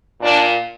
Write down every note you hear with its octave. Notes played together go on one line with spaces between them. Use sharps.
A#2 D4